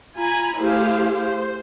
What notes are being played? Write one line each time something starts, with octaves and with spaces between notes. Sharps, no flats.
F4 G#5 A#5 B5
A3 E4 G4 G#4 C5 F5
C5